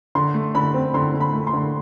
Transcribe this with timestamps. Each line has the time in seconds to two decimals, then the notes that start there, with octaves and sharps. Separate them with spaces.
0.15 D3 C6
0.34 A3
0.55 D3 B5
0.74 C4
0.94 D3 C6
1.14 D3
1.20 B5
1.33 A3
1.47 C6
1.53 D3